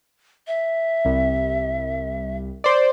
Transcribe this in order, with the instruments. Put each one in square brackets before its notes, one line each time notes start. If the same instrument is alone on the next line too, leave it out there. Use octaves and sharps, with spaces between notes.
[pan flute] E5
[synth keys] C2
C5 D5